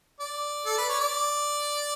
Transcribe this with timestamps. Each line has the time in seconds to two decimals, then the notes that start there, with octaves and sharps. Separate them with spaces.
0.20 D5
0.66 A4
0.78 B4
0.89 C#5
1.00 D5